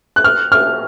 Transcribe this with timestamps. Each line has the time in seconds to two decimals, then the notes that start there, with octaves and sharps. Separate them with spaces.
0.16 F#6
0.24 F6
0.52 F6